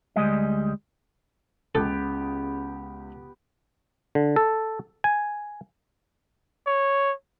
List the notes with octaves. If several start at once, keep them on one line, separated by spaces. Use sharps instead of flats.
D2 G3 G#3 D#5
C#2 C#3 B3 G4 A4
D3
A4
G#5
C#5